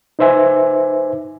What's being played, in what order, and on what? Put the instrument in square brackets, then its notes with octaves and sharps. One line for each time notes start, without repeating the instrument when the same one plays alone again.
[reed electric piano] D#4 B4 C5 E5 G#5